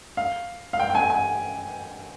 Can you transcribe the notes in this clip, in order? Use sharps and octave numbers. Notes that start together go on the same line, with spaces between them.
F5
F5
G5
G5
G#5
G#5